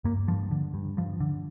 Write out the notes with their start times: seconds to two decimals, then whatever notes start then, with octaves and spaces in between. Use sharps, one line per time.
0.04 G2 A#3
0.28 G2 F3
0.51 D3
0.74 G2
0.97 G2 F3
1.20 D3